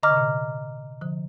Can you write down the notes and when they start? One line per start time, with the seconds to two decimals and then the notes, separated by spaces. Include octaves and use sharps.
0.03 D3 D#5 A#5 D6 F6
0.11 C3
0.17 A#2 D3
1.01 D3 F3